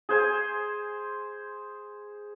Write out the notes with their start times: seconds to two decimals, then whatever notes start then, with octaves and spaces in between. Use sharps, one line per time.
0.09 G#4 C5 G#5